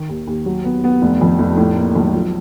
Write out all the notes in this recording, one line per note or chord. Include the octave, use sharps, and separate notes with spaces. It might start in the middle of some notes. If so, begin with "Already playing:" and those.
Already playing: D#3
D#2
D#2
F#3
B3
B3
F1
F2
F1
A2
A#3
B1
F3